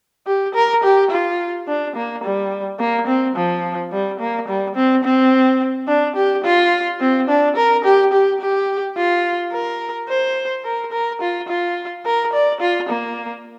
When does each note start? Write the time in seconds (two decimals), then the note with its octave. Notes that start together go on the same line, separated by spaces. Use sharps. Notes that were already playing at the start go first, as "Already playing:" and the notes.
0.27 G4
0.54 A#4
0.83 G4
1.11 F4
1.68 D4
1.96 A#3
2.24 G3
2.79 A#3
3.07 C4
3.36 F3
3.92 G3
4.19 A#3
4.48 G3
4.75 C4
5.04 C4
5.87 D4
6.16 G4
6.44 F4
7.01 C4
7.28 D4
7.56 A#4
7.85 G4
8.13 G4
8.41 G4
8.97 F4
9.53 A#4
10.09 C5
10.65 A#4
10.92 A#4
11.21 F4
11.48 F4
12.05 A#4
12.33 D5
12.61 F4
12.89 A#3